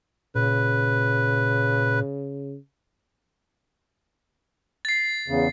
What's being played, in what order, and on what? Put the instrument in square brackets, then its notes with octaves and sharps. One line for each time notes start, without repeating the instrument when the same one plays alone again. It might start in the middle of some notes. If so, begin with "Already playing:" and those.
[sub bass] A#2 [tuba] C#3 [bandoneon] B4
[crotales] A6 C7
[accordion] E2 C#3